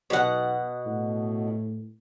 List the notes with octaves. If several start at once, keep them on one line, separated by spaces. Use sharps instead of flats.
B1 B2 F#5
A2